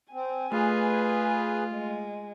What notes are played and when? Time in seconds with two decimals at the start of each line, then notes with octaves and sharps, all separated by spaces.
0.13 C4 G#5
0.52 A3 F4 G#4 B4
1.69 G#3